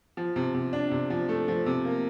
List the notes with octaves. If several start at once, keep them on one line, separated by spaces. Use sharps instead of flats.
F3
C3
C3
D4
C3
F3
A3
F3
C3
A#3